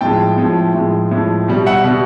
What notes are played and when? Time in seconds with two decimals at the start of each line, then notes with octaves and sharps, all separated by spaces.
0.01 A2 F3 G#3 G5 A5
0.37 A2 F3 G#3
0.74 A2 F3 G#3
1.11 A2 F3 G#3
1.48 B2 G3
1.66 E5 F#5
1.84 B2 G3